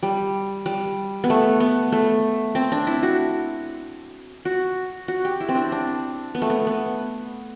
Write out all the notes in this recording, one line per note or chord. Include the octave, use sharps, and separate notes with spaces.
G3
G3
B3
A3
B3
A3
C4
D4
E4
F#4
F#4
F#4
G4
E4
C4
D4
D4
B3
A3
B3
B3